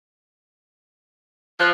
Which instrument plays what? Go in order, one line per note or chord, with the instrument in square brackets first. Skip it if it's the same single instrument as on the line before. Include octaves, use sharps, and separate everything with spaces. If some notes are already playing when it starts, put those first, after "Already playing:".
[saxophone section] F3 [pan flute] F#6